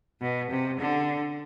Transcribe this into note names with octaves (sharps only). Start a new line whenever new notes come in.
B2
C3
D3